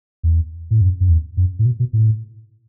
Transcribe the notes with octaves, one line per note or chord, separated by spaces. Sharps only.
E2
A2
F#2
F#2
E2
F#2
A2
B2
B2
A2